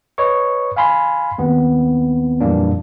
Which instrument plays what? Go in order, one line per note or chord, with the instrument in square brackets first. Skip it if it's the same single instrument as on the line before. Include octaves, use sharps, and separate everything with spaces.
[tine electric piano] B4 C#5 D#5 C#6
F5 G#5 B5 C6
D#2 B3 C4
F2 A#2 E3 G3 A#3 D4